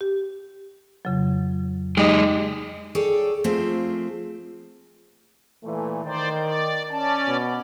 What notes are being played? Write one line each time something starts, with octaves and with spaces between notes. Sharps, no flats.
G4
F2 C#3 F#3
G#3 D#4 G4 D#5 D#6
G#4 A4 C#5 D5 G5
F3 A3 C4 F4 G#4
A#2 E3 A3
D#3 C5 D5
D5
C#4 D5 A5
B2